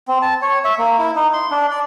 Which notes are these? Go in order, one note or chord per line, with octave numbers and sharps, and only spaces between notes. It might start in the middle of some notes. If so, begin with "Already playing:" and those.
C4
A5
C#5
E5
A#3
E4
D#4
C6
D4
D5